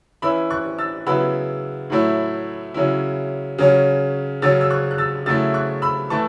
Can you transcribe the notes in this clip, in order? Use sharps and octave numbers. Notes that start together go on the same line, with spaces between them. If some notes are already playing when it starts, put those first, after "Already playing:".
E3 C#4 E4 B5 E6
C#6 F#6
E6 A6
C#3 F#3 B3 E4 B5 E6
A2 F#3 A3 E4
C#3 F#3 C#4 E4
C#3 F#3 C#4
C#3 F#3 C#4 E6 A6
E6
C#6 F#6
F#6
E6 A6
C#3 F#3 A3 E4 E6 A6
C#6 F#6
B5 E6
E3 A3 E4 A5 C#6